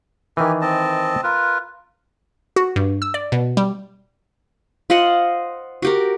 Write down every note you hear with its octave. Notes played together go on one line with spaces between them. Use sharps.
D#3 E3 G4 G#5
C4 D#5 A5
F4 A#4 B4
F#4
G2
E6
D5
B2
G3
F4 C5 D#5 F#5
F#4 G4 A#4